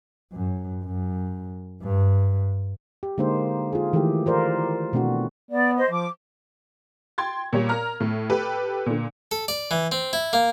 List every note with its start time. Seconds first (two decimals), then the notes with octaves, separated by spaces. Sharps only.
0.32 F#2
0.83 F#2
1.82 G2
3.03 G4
3.18 D3 G#3 A#3 D#4 C5
3.73 F4 G#4
3.93 D#3 E3 A3 E4 G4
4.26 F4 A#4 C5 D5
4.93 B2 A3 C4 D4 F#4
5.51 B3 D5
5.76 C5 D#5
5.90 F3 D6
7.18 G5 C6 G#6 A6
7.53 A#2 G3 C#5
7.69 A#4 A#5 F6
8.00 A2
8.30 G4 A4 B4
8.86 A#2 D3
9.31 A4
9.48 D5
9.71 E3
9.92 C4
10.13 E4
10.33 A#3